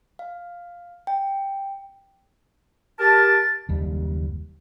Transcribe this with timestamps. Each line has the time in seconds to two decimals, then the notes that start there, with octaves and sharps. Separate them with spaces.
0.19 F5
1.07 G5
2.99 G4 A#4 A5 A6
3.69 F#1 D#2 G3